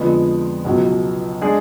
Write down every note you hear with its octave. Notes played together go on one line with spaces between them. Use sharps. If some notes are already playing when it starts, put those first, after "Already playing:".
Already playing: F2 D3 F3 G#3 B3
C#2 B2 F#3
G#3 D4 G#4